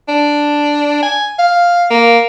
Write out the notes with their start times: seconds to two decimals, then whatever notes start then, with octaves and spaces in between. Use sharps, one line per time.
0.09 D4
1.03 G#5
1.39 F5
1.91 A#3